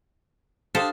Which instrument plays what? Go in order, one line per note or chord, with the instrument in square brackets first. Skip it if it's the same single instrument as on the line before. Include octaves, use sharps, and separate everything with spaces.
[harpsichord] D4 D#5 F5 [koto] G4 A4 C5